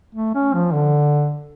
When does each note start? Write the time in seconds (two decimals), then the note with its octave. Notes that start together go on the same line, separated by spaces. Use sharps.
0.15 A3
0.35 C#4
0.54 F3
0.73 D3